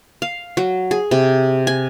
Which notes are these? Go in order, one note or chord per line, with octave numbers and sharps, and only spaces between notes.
F5
F#3
G#4
C3
G#5